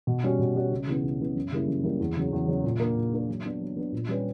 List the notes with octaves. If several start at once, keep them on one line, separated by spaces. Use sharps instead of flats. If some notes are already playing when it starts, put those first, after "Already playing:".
B2
G3 C#4 F#4 C#5
B2
G3 C#4 F#4 C#5
C#2
C#3 E3 B3
C#2
C#3 E3 B3
F#2
C#3 G3 A#3 E4
F#2
C#3 G3 A#3 E4
E2
C#3 F#3
E2
C#3 F#3
A#2
A#3 D4
A#2
A#3 D4
F#3
B3 D4
F#3
B3 D4
A#2
G3 C#4 G4 B4